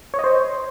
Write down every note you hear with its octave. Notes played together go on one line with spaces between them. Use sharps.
C#5
D#5
C5